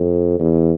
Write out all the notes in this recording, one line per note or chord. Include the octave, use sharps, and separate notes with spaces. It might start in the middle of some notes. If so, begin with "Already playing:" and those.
Already playing: F2
E2